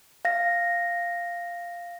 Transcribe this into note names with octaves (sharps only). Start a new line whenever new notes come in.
F5 A#6